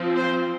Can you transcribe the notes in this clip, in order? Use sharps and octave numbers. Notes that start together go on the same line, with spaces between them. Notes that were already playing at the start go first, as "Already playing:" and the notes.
Already playing: F3 C4
C5